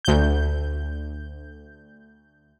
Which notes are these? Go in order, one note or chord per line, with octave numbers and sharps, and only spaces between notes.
D2 G6